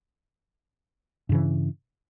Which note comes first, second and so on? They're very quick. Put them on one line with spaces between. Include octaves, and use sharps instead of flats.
G2 C#3 E3